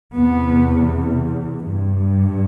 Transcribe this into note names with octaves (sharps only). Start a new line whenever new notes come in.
E2 C3 B3
G2